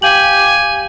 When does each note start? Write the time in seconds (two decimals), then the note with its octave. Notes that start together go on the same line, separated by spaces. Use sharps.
0.02 G4 F5 G#5 G6 F#7